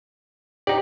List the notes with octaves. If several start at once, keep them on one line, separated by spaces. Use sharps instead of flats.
D#4 G4 D5